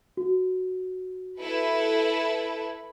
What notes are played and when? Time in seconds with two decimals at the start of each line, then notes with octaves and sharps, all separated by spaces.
0.17 F#4
1.39 E4 A4 B4